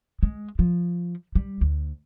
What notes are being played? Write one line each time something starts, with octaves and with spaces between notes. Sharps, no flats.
G#3
F3
G3
D2